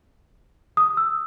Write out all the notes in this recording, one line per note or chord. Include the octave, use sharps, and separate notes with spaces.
D#6
E6